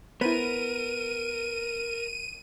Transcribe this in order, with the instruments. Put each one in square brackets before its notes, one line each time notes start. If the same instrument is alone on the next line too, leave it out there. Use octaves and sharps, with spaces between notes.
[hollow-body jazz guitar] B3 [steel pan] E4 C5 [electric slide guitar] A#4 [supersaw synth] D#7